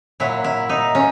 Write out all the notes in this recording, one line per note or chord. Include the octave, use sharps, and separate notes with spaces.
A#2 F#3 E4
E4
D#4
C#4